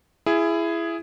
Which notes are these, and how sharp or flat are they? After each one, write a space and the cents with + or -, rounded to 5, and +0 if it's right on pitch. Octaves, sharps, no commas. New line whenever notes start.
E4 +20 G#4 +0